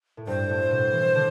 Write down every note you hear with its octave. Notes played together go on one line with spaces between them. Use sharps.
A2
G2 C5
A2
B2
E3
D3